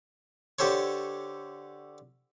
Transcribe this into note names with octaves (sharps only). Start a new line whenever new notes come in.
D3 G4 A4 C5 C#5